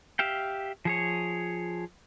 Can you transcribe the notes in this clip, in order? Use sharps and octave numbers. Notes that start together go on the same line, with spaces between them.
G4 E5 F5 G5
F3 G#4 C#5